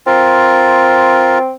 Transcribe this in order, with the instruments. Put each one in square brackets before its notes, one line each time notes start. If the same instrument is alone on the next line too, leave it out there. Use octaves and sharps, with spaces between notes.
[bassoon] C4 [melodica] F4 A#4